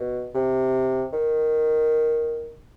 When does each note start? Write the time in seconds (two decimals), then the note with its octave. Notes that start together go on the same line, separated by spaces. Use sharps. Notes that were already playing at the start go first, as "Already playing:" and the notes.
Already playing: B2
0.35 C3
1.12 D#3